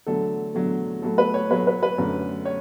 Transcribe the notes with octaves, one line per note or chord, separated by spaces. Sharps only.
E2 D3 F#3 A3 A4
E2 D3 F#3 A3
A2 F#3 A3 A4
B4
C#5
A2 F#3 A3 B4
B4
B4
F#2 D3 A3
C#5